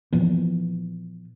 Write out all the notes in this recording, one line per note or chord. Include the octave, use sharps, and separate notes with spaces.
A#2 E3 F3 B3